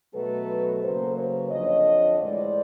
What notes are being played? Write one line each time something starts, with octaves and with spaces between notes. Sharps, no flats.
B2 F#3 A3 A4 B4
C#3 F#3 A#3 A#4 C5
B4 C#5
F2 D3 F3 C#5 D#5
A2 E3 G#3 C5 D5